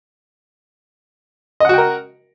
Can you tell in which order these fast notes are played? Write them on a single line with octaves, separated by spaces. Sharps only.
D#5 F#5 F#4 G5 A#4